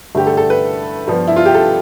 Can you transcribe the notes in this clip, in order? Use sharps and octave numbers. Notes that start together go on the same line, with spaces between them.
G2 D3 A3 G4
A4
A4
B4
G2 F3 B3
E4
F4
G4
A4